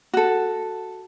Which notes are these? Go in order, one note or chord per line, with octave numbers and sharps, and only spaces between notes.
F#4 A4